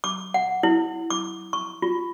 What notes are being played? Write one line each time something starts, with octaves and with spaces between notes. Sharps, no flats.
D6
F#5
E4
D6
C#6
F4